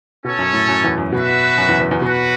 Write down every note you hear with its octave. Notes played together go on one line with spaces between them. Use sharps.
B2 C#4 A4 C#5
F#2
A2
F#2
E2
F#2
B2 F#4 B4 E5
F#2
E2
E2
E2
B2 F#4 B4